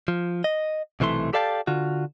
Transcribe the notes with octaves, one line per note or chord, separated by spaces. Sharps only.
F3
D#5
B1 C3 E3 A3 C6
G4 A4 D5 F5 G5 A5
D3 F4 F#4